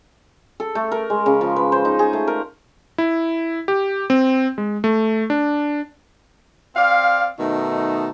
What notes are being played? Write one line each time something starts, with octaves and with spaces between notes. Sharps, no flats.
A4
A3
A#4
G#3
C#3
F3
B4
C5
D#4
G#4
A3
A#4
E4
G4
C4
G#3
A3
D4
C4 D5 F5
B2 D#3 A3 D#4